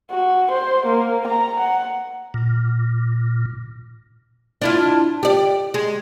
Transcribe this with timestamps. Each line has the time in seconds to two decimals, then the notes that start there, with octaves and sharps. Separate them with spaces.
0.11 F#4
0.51 C5
0.85 A#3
1.27 A#5
1.60 F#5
2.34 A#2
4.62 D4 E4 F4
5.23 G4 D5
5.74 G#3